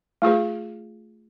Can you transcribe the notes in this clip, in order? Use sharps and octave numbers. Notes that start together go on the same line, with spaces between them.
A3 F4 G#4 B4